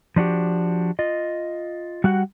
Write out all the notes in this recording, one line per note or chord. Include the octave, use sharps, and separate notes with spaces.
F3 D4 F#4 G4
F4 D#5
G3 F#4 F#5